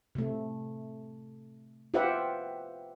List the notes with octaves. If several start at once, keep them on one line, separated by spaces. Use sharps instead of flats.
C3 A3
F4 G4 B4 C5 E5 F#5